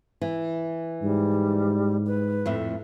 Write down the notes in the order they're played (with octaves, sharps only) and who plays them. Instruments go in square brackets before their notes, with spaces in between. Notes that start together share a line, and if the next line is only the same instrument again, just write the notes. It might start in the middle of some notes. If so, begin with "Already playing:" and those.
[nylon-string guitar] E3
[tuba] G#2 [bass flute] G3
[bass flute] B4
[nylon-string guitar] F2 A2 E5